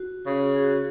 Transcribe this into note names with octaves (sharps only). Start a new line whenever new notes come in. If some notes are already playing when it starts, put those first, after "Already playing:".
Already playing: F#4
C#3
G#4
F#4